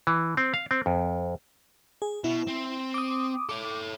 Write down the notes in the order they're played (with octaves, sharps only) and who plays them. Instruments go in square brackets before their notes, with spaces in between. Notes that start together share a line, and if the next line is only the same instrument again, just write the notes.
[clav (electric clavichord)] E3
C4
F5
C4
F2
[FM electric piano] G#4
[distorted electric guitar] B2 [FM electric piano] E4
[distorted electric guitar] C4
[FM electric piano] D6 D#6
[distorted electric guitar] A4 C#5 [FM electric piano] D6